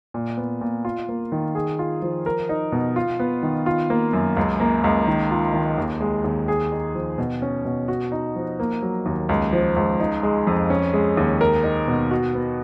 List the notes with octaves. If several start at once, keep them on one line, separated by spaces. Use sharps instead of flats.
A#2
B3
A#2
F4
A#3
D#3
G#4
F4
F3
A#4
D#4
B2
F4
B3
D#3
F4
A#3
F#2
C#2
A#3
C#2
D#3
F4
D#3
D#2
G#3
D#2
G#4
D#4
F3
B2
C#4
B2
F#4
D#4
F3
A#3
F#3
D#2
C#2
F3
C#2
D#4
G#3
F2
C#4
G#3
D#2
A#4
D#4
B2
F#4
B3